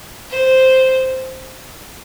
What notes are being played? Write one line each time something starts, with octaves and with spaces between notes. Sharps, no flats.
C5